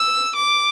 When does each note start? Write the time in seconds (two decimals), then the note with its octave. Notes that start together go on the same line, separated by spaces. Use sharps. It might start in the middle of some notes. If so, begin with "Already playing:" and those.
Already playing: E6
0.36 D6